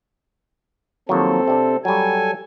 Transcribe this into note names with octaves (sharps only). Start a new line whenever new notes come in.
D#2 F3 F#3 C4 A4
C3 D4
F#3 G3 A4 G#5